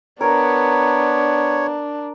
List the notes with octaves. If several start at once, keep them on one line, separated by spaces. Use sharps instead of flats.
B3 D4 A#4 C#5